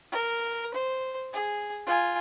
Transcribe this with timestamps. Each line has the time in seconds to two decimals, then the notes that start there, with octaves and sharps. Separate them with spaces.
0.12 A#4
0.74 C5
1.34 G#4
1.87 F4 G#5